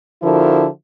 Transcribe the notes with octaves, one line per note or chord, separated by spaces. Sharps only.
D3 F3 E4 F#4 A#4